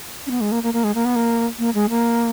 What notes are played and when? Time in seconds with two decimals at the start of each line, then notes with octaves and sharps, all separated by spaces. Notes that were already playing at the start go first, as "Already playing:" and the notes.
0.27 C#4
0.31 B3
0.41 G#3
0.52 A#3
0.63 A#3
0.74 A#3
0.84 G#3
0.95 A#3
1.05 B3
1.16 A#3
1.59 A#3
1.75 G#3
1.90 A#3